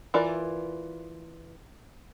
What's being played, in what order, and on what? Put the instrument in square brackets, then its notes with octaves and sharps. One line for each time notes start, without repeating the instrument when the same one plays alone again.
[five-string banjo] E3 F4 A#4 D5